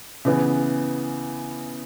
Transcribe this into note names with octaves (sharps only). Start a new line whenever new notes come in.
C#3 E3 B3